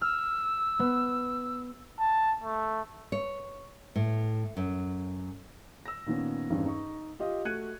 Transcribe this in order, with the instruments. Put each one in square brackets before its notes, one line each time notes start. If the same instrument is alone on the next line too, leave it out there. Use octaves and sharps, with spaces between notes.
[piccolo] E6 [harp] F6
[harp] B3
[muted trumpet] A5
A3
[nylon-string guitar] C#5
A2
F#2
[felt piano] E6 A#6
A#2 D#3 B3 C#4
E2 G2 D#3 C4 C#4
D#4 C#6
F4 G4 D#5 F5
A3 F#4 F#6 G#6 C#7 D#7